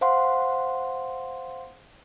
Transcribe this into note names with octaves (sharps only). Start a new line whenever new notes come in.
C5 F5 F#5 C6